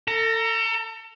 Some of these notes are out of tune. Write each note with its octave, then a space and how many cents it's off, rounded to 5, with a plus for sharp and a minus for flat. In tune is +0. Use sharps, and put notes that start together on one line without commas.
A4 +35 A#5 +0